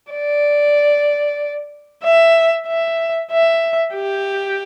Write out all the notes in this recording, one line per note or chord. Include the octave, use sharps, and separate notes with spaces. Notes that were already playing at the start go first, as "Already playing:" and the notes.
D5
E5
E5
E5
G4